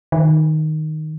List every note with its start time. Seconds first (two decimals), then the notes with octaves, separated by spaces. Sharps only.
0.12 D#3